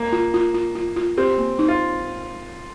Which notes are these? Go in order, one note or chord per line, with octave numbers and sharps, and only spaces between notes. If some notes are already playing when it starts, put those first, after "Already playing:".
Already playing: A#3
F4
F4
F4
F4
F4
C4 G4
A#3
D#4
F4